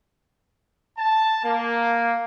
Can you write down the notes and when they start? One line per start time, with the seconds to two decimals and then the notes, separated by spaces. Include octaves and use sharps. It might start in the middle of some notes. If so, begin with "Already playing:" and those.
0.98 A5
1.44 A#3